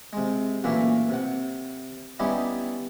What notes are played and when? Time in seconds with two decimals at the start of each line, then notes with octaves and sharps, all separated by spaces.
0.13 C3 G#3
0.64 F#2 A#2 E3 A3 A#3 E5
1.09 C3 F#5
2.19 G3 B3 C#4 D#4 E4 G4